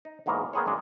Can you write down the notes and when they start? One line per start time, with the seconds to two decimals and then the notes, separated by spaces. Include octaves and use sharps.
0.05 D#4
0.26 B1 E2 G#2 B2 A#3 A#5
0.53 D#3 A#3 B3 G#4 C5 C#5
0.66 G#1 F#2 F#3 G#3 D5